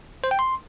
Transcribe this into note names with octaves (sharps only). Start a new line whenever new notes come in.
C5
G5
C6